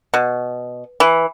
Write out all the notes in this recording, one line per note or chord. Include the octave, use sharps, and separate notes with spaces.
B2
E3